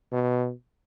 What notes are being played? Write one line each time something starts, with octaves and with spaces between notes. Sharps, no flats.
B2